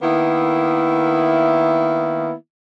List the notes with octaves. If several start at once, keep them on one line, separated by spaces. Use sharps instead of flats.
D#3 A#3 B3 E4